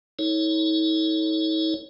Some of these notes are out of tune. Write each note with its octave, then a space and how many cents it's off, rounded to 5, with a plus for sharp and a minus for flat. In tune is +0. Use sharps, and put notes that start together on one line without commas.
D#4 +45 A4 +0 C#5 +0